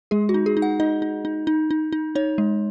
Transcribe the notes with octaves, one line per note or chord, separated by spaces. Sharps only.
G#3 G#4
F#4
D#4
G#4
D#4
F#5
D#4 D#5
D#4
D#4
D#4
D#4
D#4
D#4 C#5
G#3